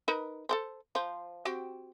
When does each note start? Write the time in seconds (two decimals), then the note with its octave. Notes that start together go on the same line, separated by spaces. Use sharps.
0.08 D#4 A#4 B4
0.49 A4 A#4 C5
0.95 F3 C5
1.45 C4 F#4 G4